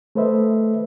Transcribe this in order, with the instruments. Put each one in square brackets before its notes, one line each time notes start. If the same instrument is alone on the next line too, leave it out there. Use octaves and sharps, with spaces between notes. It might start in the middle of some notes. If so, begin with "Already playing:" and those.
[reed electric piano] A3 A4 B4 C5 D#5 E5